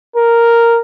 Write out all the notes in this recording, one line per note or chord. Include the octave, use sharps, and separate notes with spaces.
A#4